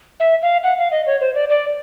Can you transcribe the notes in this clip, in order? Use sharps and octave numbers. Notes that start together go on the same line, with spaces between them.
E5
F5
F#5
F5
D#5
C#5
C5
D5
D5